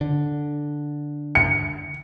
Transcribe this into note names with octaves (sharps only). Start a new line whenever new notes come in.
D3
C#7